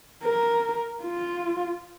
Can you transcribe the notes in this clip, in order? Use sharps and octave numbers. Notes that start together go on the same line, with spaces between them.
A#4
F4